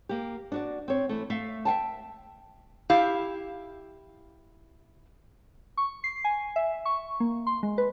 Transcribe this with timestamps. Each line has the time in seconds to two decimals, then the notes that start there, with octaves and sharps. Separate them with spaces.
0.09 A#3 G4
0.52 D4 F#4 D5
0.88 C4 C#5
1.09 E3 A3
1.30 A3 E5 F5
1.65 E5 F5 G5 A5
2.90 E4 G4 F5
5.77 C#6
6.04 C7
6.24 G#5
6.56 E5
6.86 C#6
7.20 A#3
7.47 C6
7.63 G#3
7.78 B4